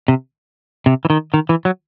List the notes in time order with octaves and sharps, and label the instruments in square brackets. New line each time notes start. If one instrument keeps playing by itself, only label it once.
[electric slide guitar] C3
C3
E3
D#3
D#3
E3
F#3